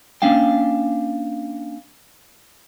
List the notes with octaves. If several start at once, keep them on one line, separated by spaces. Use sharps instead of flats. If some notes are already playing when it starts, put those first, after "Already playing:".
A#3 C#4 D4 F5 G5